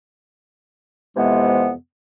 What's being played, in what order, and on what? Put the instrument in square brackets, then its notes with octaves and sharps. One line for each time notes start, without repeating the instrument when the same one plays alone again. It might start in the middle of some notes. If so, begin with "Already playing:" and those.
[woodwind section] F2 C3 E3 G#3 B3